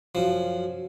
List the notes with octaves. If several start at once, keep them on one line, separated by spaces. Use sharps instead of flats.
F#2 F3